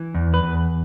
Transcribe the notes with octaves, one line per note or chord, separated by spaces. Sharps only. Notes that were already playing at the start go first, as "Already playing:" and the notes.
Already playing: E3
E2
B4
E2